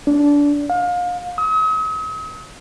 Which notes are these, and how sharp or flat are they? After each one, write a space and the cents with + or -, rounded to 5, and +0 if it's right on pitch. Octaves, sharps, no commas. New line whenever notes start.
D4 -20
F5 +30
D#6 +45